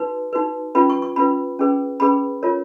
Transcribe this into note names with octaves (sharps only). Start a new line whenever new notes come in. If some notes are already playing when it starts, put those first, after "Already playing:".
Already playing: D#4 F#4 B4
D#4 F#4 B4
C#4 F4 B4 B5
C#6
C#6
C#4 F4 B4 B5
C#4 G#4 B4
C#4 G#4 B4 B5
F4 A#4 C#5